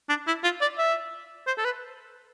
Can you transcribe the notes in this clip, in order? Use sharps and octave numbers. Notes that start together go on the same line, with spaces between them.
D4
E4
F4
D5
E5
C5
A4
B4